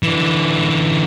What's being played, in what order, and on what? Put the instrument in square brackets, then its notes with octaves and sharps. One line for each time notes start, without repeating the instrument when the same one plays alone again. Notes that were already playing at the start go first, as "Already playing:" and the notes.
[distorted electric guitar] D3 E3